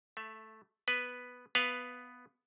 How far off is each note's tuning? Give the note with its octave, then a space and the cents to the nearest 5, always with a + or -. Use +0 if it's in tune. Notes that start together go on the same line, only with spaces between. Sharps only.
A3 -5 E5 +20
B3 +0 B4 +0
B3 +5 B4 +0 F5 +0